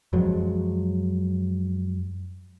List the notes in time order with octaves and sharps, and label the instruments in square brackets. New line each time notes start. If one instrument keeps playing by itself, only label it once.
[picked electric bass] F#2 F3 F#3 G#3